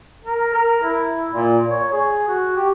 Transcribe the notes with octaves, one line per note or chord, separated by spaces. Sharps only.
A#4
A#4
E4
A#2
C#5
G#4
F#4
G4